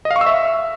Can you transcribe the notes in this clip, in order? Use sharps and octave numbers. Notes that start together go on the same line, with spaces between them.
D#5
F5
C#6
E6
E5